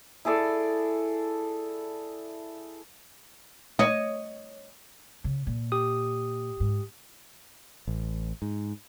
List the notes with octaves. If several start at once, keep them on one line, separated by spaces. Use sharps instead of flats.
E4 G#4 A4 D5
C#5 D#5
C#3
A#2
G4 D#6
G#2
A1
G#2